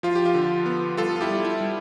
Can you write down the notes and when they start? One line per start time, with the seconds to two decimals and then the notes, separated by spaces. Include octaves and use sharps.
0.03 F3 F4
0.15 G4
0.26 F4
0.34 D3
0.66 B3
0.97 G3 F4 A4
1.16 F4
1.21 E4 G4
1.30 G3
1.45 E4
1.61 G3